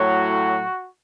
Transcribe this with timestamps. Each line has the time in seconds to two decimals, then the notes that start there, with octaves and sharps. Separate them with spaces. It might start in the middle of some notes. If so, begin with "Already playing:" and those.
Already playing: A2 F#3 F#4